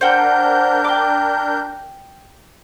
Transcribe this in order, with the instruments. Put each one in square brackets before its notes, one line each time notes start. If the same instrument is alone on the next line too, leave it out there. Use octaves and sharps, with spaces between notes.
[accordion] D4 A#4 G6 [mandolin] C5 F#5 G5
[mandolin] G5 D6